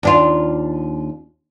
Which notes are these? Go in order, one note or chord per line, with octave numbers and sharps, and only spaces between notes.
D#2 D4 F4